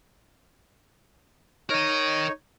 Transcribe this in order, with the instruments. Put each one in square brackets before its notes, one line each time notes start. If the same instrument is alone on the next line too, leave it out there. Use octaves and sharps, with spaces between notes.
[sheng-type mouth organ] D#4 C#5 [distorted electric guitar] A#4 D#5